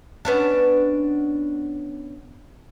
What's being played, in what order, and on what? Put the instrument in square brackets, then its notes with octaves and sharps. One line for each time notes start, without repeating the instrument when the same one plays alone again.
[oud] B3 C#4 D4